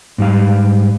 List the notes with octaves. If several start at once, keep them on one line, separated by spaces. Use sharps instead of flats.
G#2 G3 F5